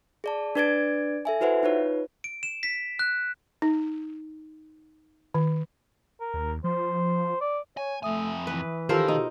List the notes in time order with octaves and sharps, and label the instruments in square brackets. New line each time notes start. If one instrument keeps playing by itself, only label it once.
[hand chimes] G#4 D5 A5
D4 B4 D5 G#6 A6 D7
A4 E5 G#5
E4 F#4 B4 C5 E5 F#5
D#4 F4 B4 C#5
[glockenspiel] D7
E7
B6
F#6
[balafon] D#4
D#3
[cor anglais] A#4
[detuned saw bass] D#2
[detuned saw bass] F3 [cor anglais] C5
[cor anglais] D5
[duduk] C#5 [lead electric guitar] G#5
[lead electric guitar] F2 G#5 [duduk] A3 [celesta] E5 D#6
[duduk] E3 [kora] B4
[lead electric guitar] D#3 [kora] F3 A#4 C5 [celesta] G4 A4 E6
[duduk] B2 [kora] D#4